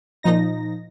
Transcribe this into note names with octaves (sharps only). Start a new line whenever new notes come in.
A#2 F3 D#4 A#6